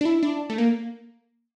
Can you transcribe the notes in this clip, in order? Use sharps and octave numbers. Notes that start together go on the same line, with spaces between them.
D4
E4
D4
A3
A#3